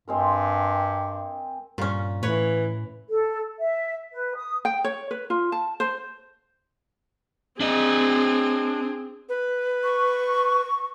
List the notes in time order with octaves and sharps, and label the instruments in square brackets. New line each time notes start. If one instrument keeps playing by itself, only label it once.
[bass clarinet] G2 [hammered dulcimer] G#3 C4 A#4
[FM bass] G2 [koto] A#2 C#4
[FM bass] A2 [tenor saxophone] E3 [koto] B4 C#5
[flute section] A4
E5
B4
D#6
[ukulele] G5
C#5
B4
F4
A5
C5
[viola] C4 G#4 [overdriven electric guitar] D4 D#5
[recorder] B4
[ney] C#6